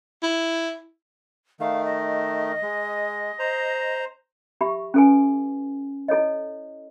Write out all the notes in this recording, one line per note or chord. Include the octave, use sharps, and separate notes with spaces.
E4
D#3 A3 F5
D#5
G#3
C5 A#5
G4 E5 B5 C#6
C#4 E4 A4 B4 G#5
E4 A4 C#5 D#5